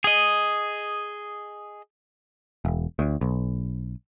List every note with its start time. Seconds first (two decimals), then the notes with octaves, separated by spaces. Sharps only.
0.04 G#4 D#5
2.65 E1
2.99 D2
3.21 B1